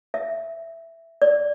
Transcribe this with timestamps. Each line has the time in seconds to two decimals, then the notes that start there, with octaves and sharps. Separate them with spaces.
0.14 E5
1.22 D5